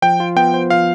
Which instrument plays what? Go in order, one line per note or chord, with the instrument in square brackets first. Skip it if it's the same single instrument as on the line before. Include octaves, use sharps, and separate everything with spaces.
[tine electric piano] F3 [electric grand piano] G5
[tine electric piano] F4
[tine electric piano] B3 [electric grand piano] G5
[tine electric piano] C5
[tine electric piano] F3 [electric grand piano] F5